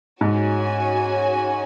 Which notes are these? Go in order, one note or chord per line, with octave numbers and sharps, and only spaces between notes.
G#2 C#4 F#4 C#5 G#5